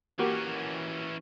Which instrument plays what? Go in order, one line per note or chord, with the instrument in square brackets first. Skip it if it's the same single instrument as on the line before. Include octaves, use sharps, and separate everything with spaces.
[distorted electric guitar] E3 C#4 [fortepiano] A#3 F#4 G4